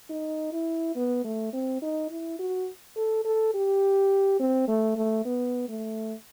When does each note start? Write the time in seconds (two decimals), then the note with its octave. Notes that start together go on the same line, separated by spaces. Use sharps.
0.10 D#4
0.53 E4
0.96 B3
1.24 A3
1.53 C4
1.82 D#4
2.11 E4
2.39 F#4
2.96 A4
3.25 A4
3.54 G4
4.40 C4
4.68 A3
4.97 A3
5.25 B3
5.69 A3